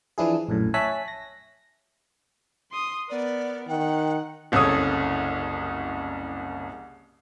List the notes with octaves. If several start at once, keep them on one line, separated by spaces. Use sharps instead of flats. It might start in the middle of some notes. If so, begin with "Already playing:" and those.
E3 F3 D4 E4 G#4
A#1 F#2 A2
C#5 E5 G#5 A5 F#6 B6
A#6
C6 D#6
B3 A#4 D5
D#3 F#5 G5
F#1 C2 C#3 A4 C#5 D#6